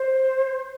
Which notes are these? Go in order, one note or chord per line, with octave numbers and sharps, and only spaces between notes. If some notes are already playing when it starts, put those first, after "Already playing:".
Already playing: C5